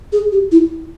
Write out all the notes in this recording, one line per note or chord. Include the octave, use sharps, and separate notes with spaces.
G#4
G4
E4